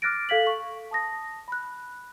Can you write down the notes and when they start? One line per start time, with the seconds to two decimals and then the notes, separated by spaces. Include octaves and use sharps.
0.02 D6 F6 F#6 A6 A#6 D7
0.29 A4 F5 G#6 B6 F#7
0.47 C#6
0.91 A5 D#6 A#6
1.48 B5 F#6